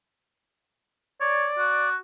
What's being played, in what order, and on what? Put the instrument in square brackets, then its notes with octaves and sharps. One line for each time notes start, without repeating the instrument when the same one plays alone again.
[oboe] C#5 [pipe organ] D5
[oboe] F#4